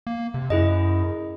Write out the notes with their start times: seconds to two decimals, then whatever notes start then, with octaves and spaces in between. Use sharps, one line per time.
0.07 A#3
0.34 C3
0.50 F#2 E4 G#4 D#5